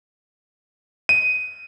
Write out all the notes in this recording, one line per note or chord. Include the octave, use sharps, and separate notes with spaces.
D#7